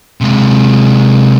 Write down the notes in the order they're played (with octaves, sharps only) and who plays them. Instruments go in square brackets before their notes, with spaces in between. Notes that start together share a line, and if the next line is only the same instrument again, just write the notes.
[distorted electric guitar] C3 G#3